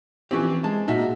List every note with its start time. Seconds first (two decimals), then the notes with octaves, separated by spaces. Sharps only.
0.31 E3 F3 C4 C#4 G4
0.64 G#3 A5
0.88 A#2 D#4 F#4 E5